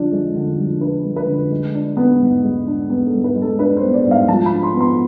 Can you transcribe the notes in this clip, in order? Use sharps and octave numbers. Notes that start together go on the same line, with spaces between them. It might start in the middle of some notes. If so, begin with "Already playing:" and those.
Already playing: D3 F3 D4
G#3
D3
F3
D4 B4
G#3
B4
D3
G#3
D4
B3
G#2
G#3
D4
B3
A4
G#2
B4
G#3
A4
D4 B4
C5
B3
D5
G#2
F5
F3 A5
B5
D4
C6
B3
C6